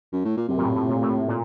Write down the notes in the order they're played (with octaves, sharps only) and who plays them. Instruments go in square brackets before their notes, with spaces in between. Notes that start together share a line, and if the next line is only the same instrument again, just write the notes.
[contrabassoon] F#2
A2
A#2
[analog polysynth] F#2 [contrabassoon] C3
[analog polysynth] A#2
A2
A2
A#2
A2
A#2